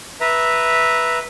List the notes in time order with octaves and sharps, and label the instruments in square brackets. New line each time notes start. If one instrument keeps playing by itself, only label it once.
[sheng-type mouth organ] B4 E5 A#5